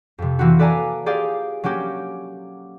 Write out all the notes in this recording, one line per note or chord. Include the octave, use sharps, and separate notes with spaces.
F2 C3
E3 A#3 C4 E4 F#4
A4 B4 D5 F5 G#5 A#5
F4 G4 G#4 D5 F5
F#3 A#3 C#4 G4